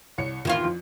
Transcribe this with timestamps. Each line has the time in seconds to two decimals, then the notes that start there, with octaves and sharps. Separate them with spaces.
0.18 C2 C#5 C#7
0.45 E2 A#2 D#3 E4 F4
0.64 F2